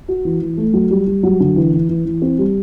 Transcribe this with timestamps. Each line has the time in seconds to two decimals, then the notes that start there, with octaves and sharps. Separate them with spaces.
0.08 F#4
0.25 E3
0.41 E3
0.58 A3
0.73 F#3
0.91 G3
1.07 G3
1.23 F#3
1.40 D3
1.56 E3
1.73 E3
1.89 E3
2.05 E3
2.22 C4
2.39 G3